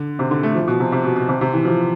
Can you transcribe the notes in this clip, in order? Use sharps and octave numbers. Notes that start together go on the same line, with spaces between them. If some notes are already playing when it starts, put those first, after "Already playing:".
Already playing: D3
C3
D3
A3
F3
B2
C3
C3
B2
B2
C3
C3
E3
F3